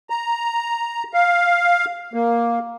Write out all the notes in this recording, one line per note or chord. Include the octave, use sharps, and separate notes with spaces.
A#5
F5
A#3